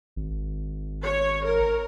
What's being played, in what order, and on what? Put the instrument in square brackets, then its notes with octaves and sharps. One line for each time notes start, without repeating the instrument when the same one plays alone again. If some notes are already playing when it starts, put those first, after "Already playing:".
[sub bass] G#1
[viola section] C#5
A#4